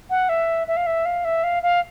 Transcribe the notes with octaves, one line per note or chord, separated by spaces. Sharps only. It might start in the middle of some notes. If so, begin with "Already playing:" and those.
F#5
E5
E5
F5
E5
F5
E5
F5
F5